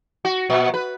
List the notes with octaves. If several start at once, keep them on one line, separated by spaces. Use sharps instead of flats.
F#4
A#2
B4